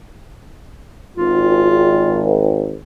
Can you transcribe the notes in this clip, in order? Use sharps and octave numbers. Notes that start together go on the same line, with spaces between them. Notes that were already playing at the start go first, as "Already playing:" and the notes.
G#1 F4